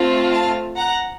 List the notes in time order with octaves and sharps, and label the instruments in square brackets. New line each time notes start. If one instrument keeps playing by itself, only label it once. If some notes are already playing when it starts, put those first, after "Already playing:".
Already playing: [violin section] A3 C4 F4
F5 A5
F#5 A#5